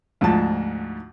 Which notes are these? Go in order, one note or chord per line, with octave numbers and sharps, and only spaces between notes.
D2 G#2 F3 A5